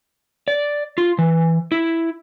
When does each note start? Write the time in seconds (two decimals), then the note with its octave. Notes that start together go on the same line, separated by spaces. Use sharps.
0.48 D5
0.98 F4
1.19 E3
1.72 E4